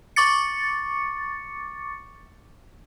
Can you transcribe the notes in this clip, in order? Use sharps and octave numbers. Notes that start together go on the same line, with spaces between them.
C#6 D6 A6 C#7